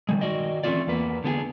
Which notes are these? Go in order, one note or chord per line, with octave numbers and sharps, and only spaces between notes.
D#3 G3 G#3
D#3 F#4 D5 D#5
E3 A3 C4 C#4 F4 D5
E2 A#3 B4
D3 B3 G4 G#4